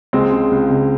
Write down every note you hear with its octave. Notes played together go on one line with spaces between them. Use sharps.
C#2 G#3 C4
C#3
C#2
C#3